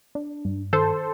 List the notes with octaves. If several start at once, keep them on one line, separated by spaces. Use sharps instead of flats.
D4
G2
D#3 A4 C5